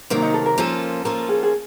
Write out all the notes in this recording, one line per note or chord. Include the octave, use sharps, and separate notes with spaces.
C3 D#3 F#3 A#3
D#4
A4
A#4
F3 A#3 C#4 F4 A4
F3 A#3 C#4 F4 A4 A#4
G#4
G#4